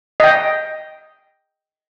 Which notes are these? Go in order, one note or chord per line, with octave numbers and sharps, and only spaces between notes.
D#5 G5